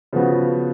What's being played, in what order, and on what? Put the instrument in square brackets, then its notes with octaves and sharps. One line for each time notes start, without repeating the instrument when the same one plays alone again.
[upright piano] C#3 F3 B3 F#4